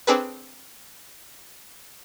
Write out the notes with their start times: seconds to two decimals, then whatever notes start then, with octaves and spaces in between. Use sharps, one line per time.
0.07 C4 D4 G#4 A4 B4